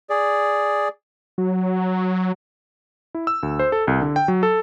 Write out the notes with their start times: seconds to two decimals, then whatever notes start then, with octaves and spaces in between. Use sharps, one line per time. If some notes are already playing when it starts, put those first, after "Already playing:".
0.10 G#4 D5
1.38 F#3
3.15 E4
3.27 E6
3.43 D2
3.59 C5
3.72 A4
3.87 C2
4.01 D3
4.16 G5
4.28 F#3
4.43 A4